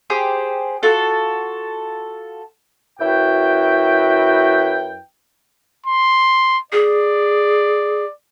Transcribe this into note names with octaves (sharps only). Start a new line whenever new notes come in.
G4 G#4 C5
F4 F#4 A4
F#2 E4 F#4 B4 G5
C6
G#4 D5